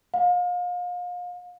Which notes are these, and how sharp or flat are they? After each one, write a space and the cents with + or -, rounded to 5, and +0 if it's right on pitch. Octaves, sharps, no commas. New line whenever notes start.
F5 +35